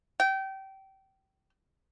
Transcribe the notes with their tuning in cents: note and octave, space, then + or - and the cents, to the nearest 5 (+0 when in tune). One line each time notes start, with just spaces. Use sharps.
G5 -25